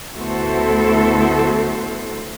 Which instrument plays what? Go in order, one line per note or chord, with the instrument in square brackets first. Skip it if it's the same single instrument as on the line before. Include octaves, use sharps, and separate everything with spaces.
[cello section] D2 B3 E4 F#4 A4 C5